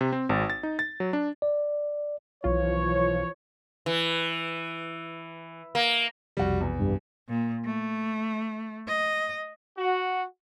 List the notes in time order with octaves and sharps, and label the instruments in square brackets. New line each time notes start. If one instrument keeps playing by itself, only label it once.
[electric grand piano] C3
C4
G#1
A6
D#4
A6
F#3
D4
[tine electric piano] D5
[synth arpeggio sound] B1 F4 [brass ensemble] E3 F3 C#5
[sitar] E3
A#3
[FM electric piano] B1 F2 C3 [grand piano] G3 F#4
[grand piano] E2
[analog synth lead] G2
[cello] A#2
A3
D#5
[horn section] F#4